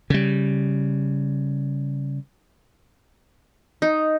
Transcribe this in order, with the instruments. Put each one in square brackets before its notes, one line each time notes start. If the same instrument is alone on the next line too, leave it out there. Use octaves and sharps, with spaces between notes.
[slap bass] C#3 G3
[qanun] D#4